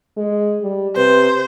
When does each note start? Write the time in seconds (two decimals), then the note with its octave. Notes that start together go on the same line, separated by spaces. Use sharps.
0.17 G#3
0.62 G3
0.96 C3 B4 C5